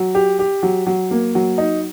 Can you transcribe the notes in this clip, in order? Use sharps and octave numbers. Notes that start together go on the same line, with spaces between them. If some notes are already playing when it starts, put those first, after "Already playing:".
Already playing: F#3
G4
G4
F#3
F#3
A#3
F#3
D#4